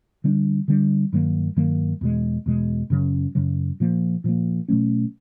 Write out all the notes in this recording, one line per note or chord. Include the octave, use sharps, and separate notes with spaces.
D3 G3 B3 D4
D3 G3 B3 D4
G2 D#3 F#3 A#3
G2 D#3 F#3 A#3
E2 B2 G#3
E2 B2 G#3
F#2 C#3 F#3
F#2 C#3 F#3
A#2 F3 A#3
A#2 F3 A#3
B2 F#3 A3 C#4